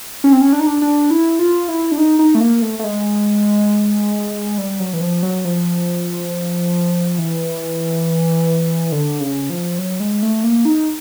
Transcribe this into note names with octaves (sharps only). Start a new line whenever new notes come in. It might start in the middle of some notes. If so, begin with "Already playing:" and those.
C#4
C4
C#4
D4
D#4
D4
D4
E4
F4
E4
D4
D#4
D#4
A3
A#3
A3
A3
G#3
G3
F#3
E3
F3
F#3
F3
E3
D3
C#3
F3
F#3
G#3
A3
A#3
D#4